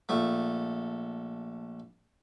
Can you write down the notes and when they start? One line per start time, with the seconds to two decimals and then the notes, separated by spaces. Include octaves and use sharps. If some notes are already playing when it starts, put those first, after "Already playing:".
0.09 A#1 A3